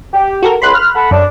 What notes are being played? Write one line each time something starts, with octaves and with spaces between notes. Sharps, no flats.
G4
F#4 A4 A#4
C#2 B5 C6 F#6
F6
A4 F#5 B5
F#2 D4